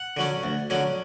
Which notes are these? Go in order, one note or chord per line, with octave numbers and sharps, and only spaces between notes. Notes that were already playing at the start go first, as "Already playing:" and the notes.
Already playing: F#5
D3 F#3 C#4
D2
D3 F#3 C#4